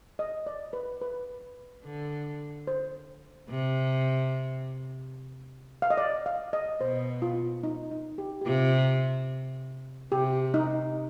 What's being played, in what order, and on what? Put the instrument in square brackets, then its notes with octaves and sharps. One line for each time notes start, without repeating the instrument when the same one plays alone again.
[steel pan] D#5
D5
B4
B4
[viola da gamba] D3
[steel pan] C5
[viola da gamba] C3
[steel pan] F5
D#5
D5
F5
D#5
[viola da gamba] B2 [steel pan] C5
[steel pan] F4
D#4
D#4
G4
G4
[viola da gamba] C3 [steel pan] F4
[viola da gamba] C3 [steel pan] G4
[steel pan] D#4